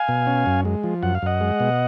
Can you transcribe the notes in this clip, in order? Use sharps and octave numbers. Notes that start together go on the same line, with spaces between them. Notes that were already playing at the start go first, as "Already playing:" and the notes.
Already playing: F5 G#5
B2
C#4
F#2
G#3
F3
F#2 F#5
F5
F#2 D#5 F#5
G#3
B2